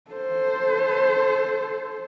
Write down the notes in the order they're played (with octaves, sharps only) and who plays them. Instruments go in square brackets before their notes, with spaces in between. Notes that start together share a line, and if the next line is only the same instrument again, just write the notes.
[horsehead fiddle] A4 C5